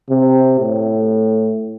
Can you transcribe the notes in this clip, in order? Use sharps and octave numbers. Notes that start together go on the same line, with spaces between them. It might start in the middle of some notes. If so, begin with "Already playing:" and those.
C3
A2